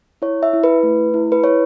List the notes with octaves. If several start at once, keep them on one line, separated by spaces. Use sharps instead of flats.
E4 C#5
E5
E4
B4
A3
E4
B4
E4 C#5